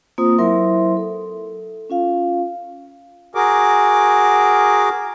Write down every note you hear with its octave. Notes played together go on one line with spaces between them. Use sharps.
A#3 C4 F4 C5 D#6
F#3 E4 A#4 C5 E5 C6
A4
C#4 F4 F5
F#4 G#4 A#4 D6